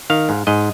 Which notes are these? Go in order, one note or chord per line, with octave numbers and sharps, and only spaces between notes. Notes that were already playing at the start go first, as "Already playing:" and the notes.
D#3 F5
G#2
G#2 D#5